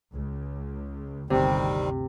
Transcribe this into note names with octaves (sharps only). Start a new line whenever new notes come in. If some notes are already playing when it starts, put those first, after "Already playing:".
C#2
G1 D2 C3 D#3 G3 C4